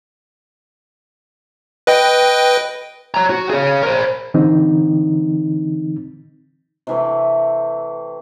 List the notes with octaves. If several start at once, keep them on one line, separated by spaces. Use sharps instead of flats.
B4 D#5 G5
C#5 A#5
F#4
G#4 C#5
A#4 C5
D3 E3 C4 D#4
C3 E3 A3